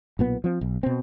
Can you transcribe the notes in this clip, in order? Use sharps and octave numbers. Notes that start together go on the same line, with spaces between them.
B1 A#2 B3
F3 C4
B1
B2 C4